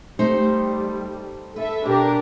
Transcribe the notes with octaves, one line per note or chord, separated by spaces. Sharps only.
G3 A3 D#4 C5
A4 B4 E5
B2 D4 G4 A#4